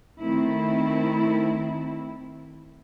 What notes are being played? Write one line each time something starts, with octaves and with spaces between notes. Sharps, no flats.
D#3 A3 C4 E4